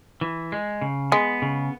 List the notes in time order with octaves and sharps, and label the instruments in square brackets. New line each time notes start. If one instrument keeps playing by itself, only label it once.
[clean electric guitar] E3
G#3
C#3
[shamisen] G#3 [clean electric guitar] B3
[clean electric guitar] C#3